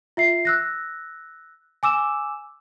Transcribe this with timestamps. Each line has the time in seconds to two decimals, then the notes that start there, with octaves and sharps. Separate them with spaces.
0.17 F4 E5 C7
0.45 E6 F#6 A#6
1.83 G#5 D6 E6 E7